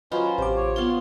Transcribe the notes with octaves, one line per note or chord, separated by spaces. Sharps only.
F#3 C#4 F4 B4 C5 D#5 F5
A1 C3 C5 D6
C#5
B3 F4 C6